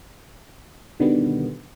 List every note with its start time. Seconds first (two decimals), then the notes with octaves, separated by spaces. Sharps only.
1.00 B2 D3 D#3 G3 B3